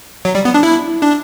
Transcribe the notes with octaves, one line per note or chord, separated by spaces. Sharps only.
F#3
G3
B3
D4
E4
D4